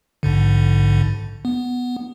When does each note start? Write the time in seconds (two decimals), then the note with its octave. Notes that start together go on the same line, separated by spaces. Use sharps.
0.23 A#1 G#2 D3
1.45 B3